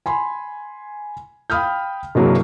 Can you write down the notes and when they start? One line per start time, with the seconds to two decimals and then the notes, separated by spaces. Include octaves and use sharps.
0.06 G#5 B5 C6
1.50 F5 G5 B5 D#6 F6 G6
2.15 C2 G2 E3 F#3 G#3 A#3